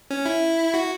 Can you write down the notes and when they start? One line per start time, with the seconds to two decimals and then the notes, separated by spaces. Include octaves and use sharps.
0.11 C#4
0.26 E4
0.74 F#4